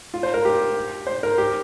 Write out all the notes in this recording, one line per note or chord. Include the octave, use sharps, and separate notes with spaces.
F4
C5
A#4
G4
C5
A#4
G4